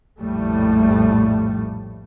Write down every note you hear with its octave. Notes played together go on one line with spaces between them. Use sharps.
A#1 F2 A2 G3 A3